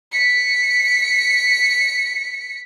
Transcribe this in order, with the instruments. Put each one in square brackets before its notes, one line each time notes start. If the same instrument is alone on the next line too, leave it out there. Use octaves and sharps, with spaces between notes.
[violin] B6 C#7